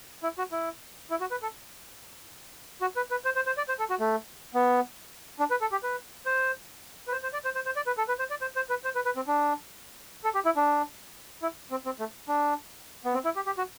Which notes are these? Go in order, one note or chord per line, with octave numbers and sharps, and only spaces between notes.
E4
F#4
E4
E4
F#4
B4
A4
F#4
B4
B4
C5
C5
C5
D5
C5
A4
F#4
A3
B3
D4
B4
A4
G4
B4
C5
B4
C5
C5
D5
C5
C5
C5
D5
B4
A4
B4
C5
D5
C5
C5
B4
C5
B4
B4
C4
D4
A4
G4
E4
D4
E4
C4
C4
A3
D4
B3
C4
E4
G4
G4
F#4